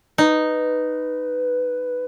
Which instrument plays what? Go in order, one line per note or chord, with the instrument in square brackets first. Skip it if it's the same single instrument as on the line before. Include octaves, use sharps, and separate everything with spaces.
[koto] D#4 [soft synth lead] B4